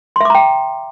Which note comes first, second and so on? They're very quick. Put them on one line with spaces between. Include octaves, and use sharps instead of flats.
C6 E5 D6 A#5 G5